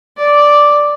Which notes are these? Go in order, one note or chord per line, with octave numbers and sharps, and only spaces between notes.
D5